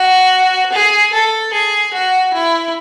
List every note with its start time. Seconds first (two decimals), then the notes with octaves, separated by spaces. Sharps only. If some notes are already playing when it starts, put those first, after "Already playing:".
Already playing: F#4
0.72 G#4
1.13 A4
1.53 G#4
1.93 F#4
2.33 E4